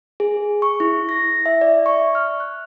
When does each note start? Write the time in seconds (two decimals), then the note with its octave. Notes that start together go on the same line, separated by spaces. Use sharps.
0.20 G#4
0.62 C#6
0.80 E4
1.09 A#6
1.46 E5
1.61 D5
1.86 C#6
2.15 F6
2.40 F#6